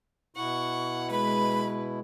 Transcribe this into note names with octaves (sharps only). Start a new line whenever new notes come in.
B2 E4 F#5 C#6
G#3 B4 B5